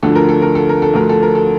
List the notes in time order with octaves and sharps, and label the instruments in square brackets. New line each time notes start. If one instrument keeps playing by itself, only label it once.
[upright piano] D2 D3 F3 A4
A#4
A4
A#4
A4
A#4
A4
D2 D3 F3 A#4
A4
A#4
A4